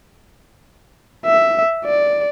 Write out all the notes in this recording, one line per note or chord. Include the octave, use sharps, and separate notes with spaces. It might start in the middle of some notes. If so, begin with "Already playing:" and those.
E5
D5